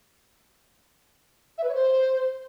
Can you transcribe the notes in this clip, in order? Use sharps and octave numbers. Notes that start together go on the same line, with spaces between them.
E5
B4
C#5
C5